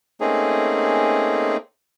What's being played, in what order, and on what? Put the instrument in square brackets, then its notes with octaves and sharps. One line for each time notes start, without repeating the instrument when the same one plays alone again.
[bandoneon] A3 A#3 C4 C#4 D#4 G#4